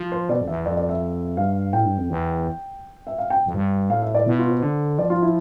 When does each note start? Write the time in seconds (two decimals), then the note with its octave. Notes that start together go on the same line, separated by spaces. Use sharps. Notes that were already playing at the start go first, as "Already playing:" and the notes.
Already playing: F3
0.12 C5
0.29 B2 D5
0.41 F2
0.48 E2 E5
0.65 F2 D5
0.77 D5
0.89 E5
1.37 G2 F5
1.73 A2 G5
1.85 G2
1.98 F2
2.09 E2
3.07 E5
3.18 F5
3.30 G5
3.46 F2
3.54 G2
3.90 A2 F5
4.02 E5
4.15 D5
4.26 B2 E4
4.39 F4
4.50 C5
4.63 D3
4.98 F3 D5
5.10 F4
5.22 E4